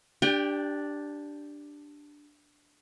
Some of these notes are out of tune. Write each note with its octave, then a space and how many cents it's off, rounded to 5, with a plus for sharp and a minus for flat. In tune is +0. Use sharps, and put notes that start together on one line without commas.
D4 +0 G4 +0 G5 +35